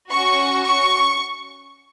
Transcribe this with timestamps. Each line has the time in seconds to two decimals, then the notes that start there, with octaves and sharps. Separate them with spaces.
0.11 C#4 F#4 C#6
0.64 C#6